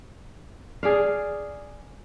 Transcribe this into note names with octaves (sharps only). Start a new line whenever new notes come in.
G#4 D5 F5